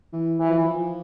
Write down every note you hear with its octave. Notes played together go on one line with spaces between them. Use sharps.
E3
E3
F3
E3
F3